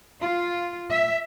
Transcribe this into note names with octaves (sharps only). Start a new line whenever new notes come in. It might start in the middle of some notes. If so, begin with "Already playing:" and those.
F4
E5